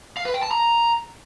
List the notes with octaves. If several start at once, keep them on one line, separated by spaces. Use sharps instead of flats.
F5
B4
G5
A5
A#5